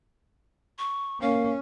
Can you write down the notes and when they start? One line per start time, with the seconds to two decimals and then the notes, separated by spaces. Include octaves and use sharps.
0.79 C#6
1.22 A#3 C#4 F5